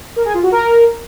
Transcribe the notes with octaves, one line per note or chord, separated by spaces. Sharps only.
A#4
G#4
F4
F#4
A#4